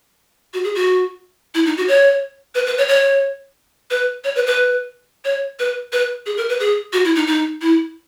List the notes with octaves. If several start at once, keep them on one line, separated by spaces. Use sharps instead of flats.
F#4
G#4
F#4
E4
D#4
F#4
C#5
B4
B4
C#5
C#5
B4
C#5
B4
B4
C#5
B4
B4
G#4
A#4
B4
G#4
F#4
E4
D#4
D#4
E4